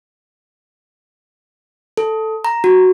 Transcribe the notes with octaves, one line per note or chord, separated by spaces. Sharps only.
A4
A#5
F#4